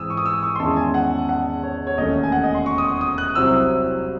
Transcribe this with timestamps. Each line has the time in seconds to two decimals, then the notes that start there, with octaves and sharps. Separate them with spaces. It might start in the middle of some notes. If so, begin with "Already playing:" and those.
Already playing: G#2 E3 C4 D#6 E6
0.10 C#6
0.17 D#6
0.26 E6
0.43 C#6
0.56 C6
0.60 E2 D#3 G#3 C#4 E4 A5
0.76 G#5
0.94 F#5
1.29 F#5
1.63 C#5
1.87 C#5
1.97 E1 D#2 D#3 A3 C#4 D#5
2.23 G#5
2.32 F#5
2.43 D#5
2.55 C6
2.66 C#6
2.78 D#6
3.01 D#6
3.18 F#6
3.35 C2 C3 F#3 C4 E4 E6